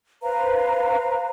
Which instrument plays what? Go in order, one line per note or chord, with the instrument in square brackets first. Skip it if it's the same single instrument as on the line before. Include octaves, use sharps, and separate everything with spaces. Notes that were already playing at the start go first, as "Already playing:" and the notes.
[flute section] B4 C5 F5 A#5